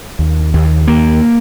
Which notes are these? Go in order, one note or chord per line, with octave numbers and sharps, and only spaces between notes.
D#2
D#2
D#2 A#3